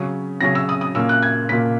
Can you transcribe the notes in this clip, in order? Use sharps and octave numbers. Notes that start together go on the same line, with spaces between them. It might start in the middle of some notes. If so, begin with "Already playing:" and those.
Already playing: C#3 F#3 C#4
C#3 F#3 C#4 A#6
E6
D#6
D#6
A#2 A#3 C#4 E6
F#6
G#6
A#2 A#3 C#4 B6